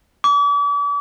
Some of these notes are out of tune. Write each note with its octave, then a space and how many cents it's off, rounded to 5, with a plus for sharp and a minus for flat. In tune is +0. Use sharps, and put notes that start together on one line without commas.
D6 -40